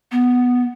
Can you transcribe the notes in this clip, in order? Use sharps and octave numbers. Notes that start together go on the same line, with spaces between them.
B3